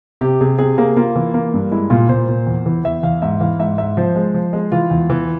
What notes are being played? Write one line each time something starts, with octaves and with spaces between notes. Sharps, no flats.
C3 G4
C3 G#4
C3 G#4
A#3 G#4
A#3 F4
E3
A#3
G2
G#3 E4
A#2 F4
A#2 C5
A#2
E2
E3
E2 E5
E2 F5
G#2 E5
E3 F5
G#2 E5
G#2 E5
F3 C5
G#3
F3
G#3
E3 F4
E2
E3